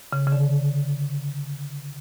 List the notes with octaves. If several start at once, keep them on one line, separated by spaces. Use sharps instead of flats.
C#3
C#3
D3